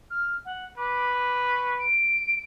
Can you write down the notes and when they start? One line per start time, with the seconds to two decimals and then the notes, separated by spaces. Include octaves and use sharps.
0.10 F6
0.45 F#5
0.78 B4 D6
1.18 D6
1.49 C#6
1.79 D7